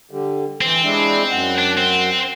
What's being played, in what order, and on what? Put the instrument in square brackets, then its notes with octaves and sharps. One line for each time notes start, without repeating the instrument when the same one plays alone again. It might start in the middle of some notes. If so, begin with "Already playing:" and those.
[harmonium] D3 G3
[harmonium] E3 [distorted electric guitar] C4
[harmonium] G#3 D4 E4
F#2 F#5
[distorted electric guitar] D4
C4